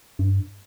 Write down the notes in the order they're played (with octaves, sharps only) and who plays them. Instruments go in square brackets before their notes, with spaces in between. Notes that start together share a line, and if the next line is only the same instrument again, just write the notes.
[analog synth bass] G2